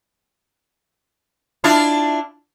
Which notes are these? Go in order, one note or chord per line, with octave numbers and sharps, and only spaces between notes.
D4 E4 F4